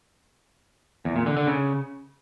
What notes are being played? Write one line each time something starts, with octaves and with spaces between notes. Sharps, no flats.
E2
A#2
D3
D3
C#3